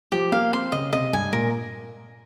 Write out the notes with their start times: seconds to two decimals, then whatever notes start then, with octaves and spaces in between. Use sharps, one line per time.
0.12 F3 G4
0.32 A#3 F5
0.52 C4 C6
0.72 C#3 D#5
0.93 C3 D#5
1.13 G2 G#5
1.33 A#2 A#4